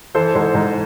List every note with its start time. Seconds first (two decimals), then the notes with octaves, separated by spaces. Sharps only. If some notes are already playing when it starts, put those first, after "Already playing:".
0.15 E3 A4 C5
0.35 G#2 A4 C5
0.55 G#2